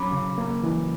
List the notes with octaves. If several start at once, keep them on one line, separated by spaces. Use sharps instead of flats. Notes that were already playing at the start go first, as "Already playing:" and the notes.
Already playing: F#3 C#4 B5 D6
C#3
A#3
E3